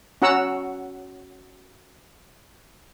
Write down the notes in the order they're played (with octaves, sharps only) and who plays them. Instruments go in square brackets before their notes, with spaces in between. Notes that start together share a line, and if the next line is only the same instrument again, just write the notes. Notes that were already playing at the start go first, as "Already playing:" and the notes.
[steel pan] C#4 F#4 F#5 A#5 E6